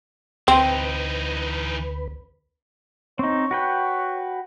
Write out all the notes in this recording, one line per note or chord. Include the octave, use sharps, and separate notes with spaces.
D2 E3 C4 D#4 B4
C4 D#4 C#5
F#4 B4 G5